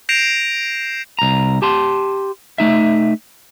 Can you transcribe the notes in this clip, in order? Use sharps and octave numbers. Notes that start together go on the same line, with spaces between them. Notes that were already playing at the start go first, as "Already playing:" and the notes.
G6 A#6 C7 D7 E7 F7
C2 A#5
G4 A5 C6
A3 D#4 E5